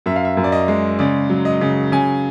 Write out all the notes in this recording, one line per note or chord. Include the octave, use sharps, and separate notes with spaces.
F#2 E5
F5
E5
F#2
D5
D#5
G#3
C#3 D5
F#3
D#5
C#3
C#3 G#5